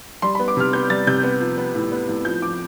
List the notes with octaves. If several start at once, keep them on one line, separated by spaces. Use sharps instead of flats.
G3 C6
B3 B5
D6
C3 F6
B3 G6
G3 A6
C3 G6
B3
F3
B3
A2
B3
A2
F3 G6
F3 D6